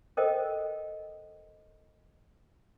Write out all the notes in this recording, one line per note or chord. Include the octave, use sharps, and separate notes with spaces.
A4 A#4 C5 D#5 G5